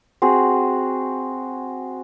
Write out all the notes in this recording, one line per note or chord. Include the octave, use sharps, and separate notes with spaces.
C4 F#4 G#4